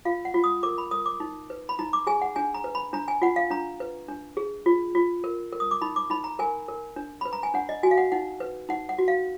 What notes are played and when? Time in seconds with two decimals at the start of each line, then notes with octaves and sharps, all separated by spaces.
0.05 F4 F5
0.25 F#5
0.34 F4
0.44 D#6
0.63 A#4 D6
0.78 B5
0.91 A#4 D#6
1.06 D6
1.20 D#4
1.50 B4
1.69 B5
1.79 D#4 A#5
1.93 D6
2.07 G#4 G#5
2.22 F#5
2.36 D4 G#5
2.54 A#5
2.64 B4
2.75 B5
2.93 D4 A#5
3.08 G#5
3.22 F4 F#5
3.36 F5
3.51 D4 A#5
3.80 B4
4.09 D4
4.37 G#4
4.66 F4
4.95 F4
5.24 A#4
5.53 A#4
5.60 D#6
5.71 D6
5.82 D#4 B5
5.96 D6
6.10 D#4 B5
6.24 A#5
6.39 A#4 G#5
6.68 A#4
6.96 D4
7.21 B4 B5
7.33 A#5
7.43 G#5
7.54 D4 F#5
7.69 D#5
7.83 F#4 G#5
7.91 F5
7.98 F#5
8.12 D#4 F#5
8.40 B4
8.69 D#4 F#5
8.89 F#5
8.98 F#4
9.08 F5